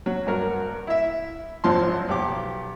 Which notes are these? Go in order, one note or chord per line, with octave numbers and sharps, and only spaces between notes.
F#3
G2 F#4 A#4
E4 E5
G#1 F#2 F3 A5 C6
B1 G4 D6